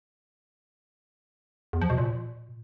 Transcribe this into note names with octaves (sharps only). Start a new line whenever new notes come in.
E2
F3
B2
A#2